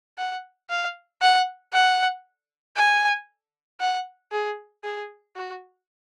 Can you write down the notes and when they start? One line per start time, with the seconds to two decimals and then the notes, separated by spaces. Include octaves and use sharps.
0.18 F#5
0.70 F5
1.21 F#5
1.73 F#5
2.76 G#5
3.80 F#5
4.32 G#4
4.84 G#4
5.36 F#4